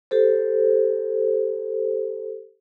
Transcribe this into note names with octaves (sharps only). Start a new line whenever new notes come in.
G4 A4 C5